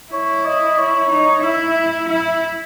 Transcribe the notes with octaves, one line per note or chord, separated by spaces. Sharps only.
E4 C#5
D#5
C#5
D#4
E4 E5
E4 E5